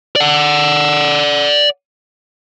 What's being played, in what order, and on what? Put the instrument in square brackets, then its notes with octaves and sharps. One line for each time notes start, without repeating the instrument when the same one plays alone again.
[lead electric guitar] D5 F#5